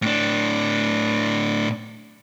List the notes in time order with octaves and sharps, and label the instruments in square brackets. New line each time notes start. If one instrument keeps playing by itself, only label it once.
[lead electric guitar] A2 D4